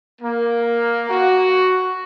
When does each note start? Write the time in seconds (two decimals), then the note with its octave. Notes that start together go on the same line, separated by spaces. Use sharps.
0.20 A#3
1.08 F#4